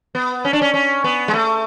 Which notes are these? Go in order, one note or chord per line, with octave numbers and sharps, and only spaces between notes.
B3
C#4
D4
C#4
C#4
B3
G#3
A3